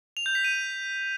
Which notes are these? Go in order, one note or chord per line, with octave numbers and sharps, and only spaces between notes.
F7
G6
B6
D#7